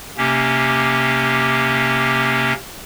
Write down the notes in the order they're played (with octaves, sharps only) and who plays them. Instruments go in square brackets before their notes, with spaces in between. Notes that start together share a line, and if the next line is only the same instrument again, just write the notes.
[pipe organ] C3 A#3 C#4 G4